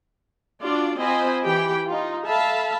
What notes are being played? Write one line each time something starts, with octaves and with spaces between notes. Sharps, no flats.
D4 F4 F#4 D5
C4 F4 C5 D#5 G#5 B5
E3 G4 G5 B5
D#4 F4
A4 E5 F5 A5 B5